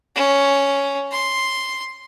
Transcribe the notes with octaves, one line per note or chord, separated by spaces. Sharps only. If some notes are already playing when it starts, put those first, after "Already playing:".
C#4
C6